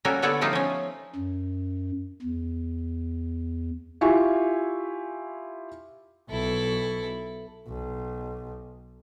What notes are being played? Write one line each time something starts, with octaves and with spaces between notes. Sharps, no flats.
G3 A#3 C#4 F#4 A4 A#4
D3 B3 D4 A4 C#5 D5
F3 G3 A3 D#4 F4
F3 C#4
F#2
E2
E4 F4 G4 E5 G#5 C#6
B1 E4 A4
B1